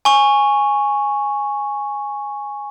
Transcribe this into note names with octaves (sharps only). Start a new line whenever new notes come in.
G#5 C#6